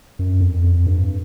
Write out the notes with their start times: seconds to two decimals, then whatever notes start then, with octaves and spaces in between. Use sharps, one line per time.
0.19 F#2
0.41 F2
0.64 F2
0.86 G2